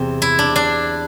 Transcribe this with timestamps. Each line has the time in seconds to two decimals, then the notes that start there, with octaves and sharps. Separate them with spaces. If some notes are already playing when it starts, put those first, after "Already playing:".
Already playing: E2 C3 C4
0.22 E4
0.39 D4
0.56 D4